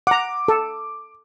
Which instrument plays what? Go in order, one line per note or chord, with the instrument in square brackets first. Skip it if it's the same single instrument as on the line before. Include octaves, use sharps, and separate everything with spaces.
[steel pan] F#5 A#5 [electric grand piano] D6
[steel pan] A4